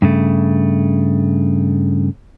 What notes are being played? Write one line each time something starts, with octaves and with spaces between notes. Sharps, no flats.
G2 C#3 A3